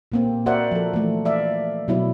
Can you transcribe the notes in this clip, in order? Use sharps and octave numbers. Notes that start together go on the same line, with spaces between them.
A#2 A#3 C4
F#4 A#4 C5 D5 E5 F#5
F3 A4
E3 A3
D5 E5 F5
B2 F#3 E4